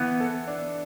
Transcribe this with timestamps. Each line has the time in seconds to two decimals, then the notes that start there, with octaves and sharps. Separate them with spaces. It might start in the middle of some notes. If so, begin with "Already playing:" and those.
Already playing: E3 B3
0.20 A4
0.47 D4